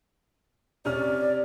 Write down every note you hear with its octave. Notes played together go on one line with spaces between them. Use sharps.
C3 C#4 D5 F6